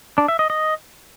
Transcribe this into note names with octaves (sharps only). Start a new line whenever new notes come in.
D4
E5
D#5
D#5